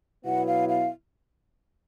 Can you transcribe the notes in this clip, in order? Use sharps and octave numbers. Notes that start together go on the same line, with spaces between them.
B2 F#3 B3 E4 F#5
F5
F5